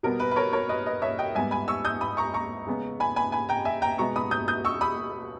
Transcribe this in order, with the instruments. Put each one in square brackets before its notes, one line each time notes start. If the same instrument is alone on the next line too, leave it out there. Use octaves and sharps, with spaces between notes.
[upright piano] B2 G3 B3 A#4
B4
B4
A#4 C#5
A#4 C#5
B4 D#5
B4 D#5
C#5 E5
D#5 G5
G#2 G3 B3 E5 G#5
G#5 B5
C#6 E6
D#6 G6
B5 D#6
A#5 C#6
A#5 C#6
C#3 G#3 B3
G#5 B5
G#5 B5
G#5 B5
G5 A#5
E5 G#5
G5 A#5
B2 G#3 B3 A#5 C#6
B5 D#6
D#6 G6
D#6 G6
C#6 E6
B5 D#6